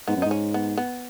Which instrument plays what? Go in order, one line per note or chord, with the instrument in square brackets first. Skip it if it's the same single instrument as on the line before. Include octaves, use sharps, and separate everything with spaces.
[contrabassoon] G#2 [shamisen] B3
[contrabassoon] F#2
[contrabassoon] G#2 [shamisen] D#4
[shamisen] C#4
B3
B3